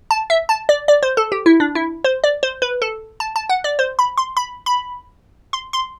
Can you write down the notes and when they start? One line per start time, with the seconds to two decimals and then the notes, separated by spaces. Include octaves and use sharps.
0.11 A5
0.30 E5
0.49 A5
0.69 D5
0.88 D5
1.03 C5
1.17 A4
1.32 G4
1.46 E4
1.60 D4
1.75 E4
2.04 C5
2.24 D5
2.43 C5
2.62 B4
2.82 A4
3.20 A5
3.36 A5
3.50 F#5
3.64 D5
3.79 C5
3.99 B5
4.18 C6
4.37 B5
4.66 B5
5.53 C6
5.73 C6